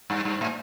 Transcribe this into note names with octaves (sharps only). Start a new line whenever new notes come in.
G2
G2
A2